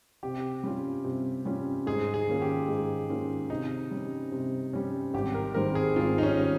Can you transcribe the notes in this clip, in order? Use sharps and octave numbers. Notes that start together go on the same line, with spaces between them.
C3 G4
G3 C#4 F4
C3
G3 C#4 F4
G#2 G#4
G#4
D#3 A#3 C#4 F4
G4
G#2
D#3 A#3 C#4 F4
C3 D#4
G3 C#4
C3
G3 C#4
G#1 G4
A#4
G#2 D#3 G3 C4 A#4
G#4
G#1 F4
D#4
C#4
D#3 G3 C4